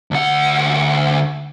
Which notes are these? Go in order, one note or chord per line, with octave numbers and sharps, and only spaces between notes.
D2 F#5